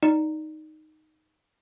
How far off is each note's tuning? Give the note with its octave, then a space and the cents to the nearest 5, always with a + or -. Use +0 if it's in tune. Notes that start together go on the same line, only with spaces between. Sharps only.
D#4 +0 D5 +0